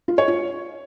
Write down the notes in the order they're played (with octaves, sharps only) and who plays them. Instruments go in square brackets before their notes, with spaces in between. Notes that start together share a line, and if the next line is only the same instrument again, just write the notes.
[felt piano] F4
C#5
F4